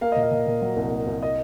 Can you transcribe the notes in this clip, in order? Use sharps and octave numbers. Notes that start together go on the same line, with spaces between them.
A#3 F5
A#2 D#5
F5
A#2
A#2
F#3
C2
A#3
C2
D#5